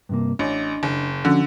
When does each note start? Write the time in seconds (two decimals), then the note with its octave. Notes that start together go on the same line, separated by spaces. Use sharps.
0.09 G2 C3 A#3
0.39 A1 D4 D#5
0.83 F#1
1.25 D3 F3 C#4 F#4